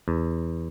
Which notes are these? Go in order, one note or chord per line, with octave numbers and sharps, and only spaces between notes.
E2